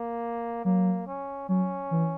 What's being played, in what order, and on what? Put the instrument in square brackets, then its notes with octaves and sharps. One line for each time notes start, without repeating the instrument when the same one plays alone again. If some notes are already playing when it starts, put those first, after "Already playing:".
Already playing: [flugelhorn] A#3
[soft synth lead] F#3 [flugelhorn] A#3
[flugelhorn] C#4
[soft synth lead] F#3 [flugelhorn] C#4
[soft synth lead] E3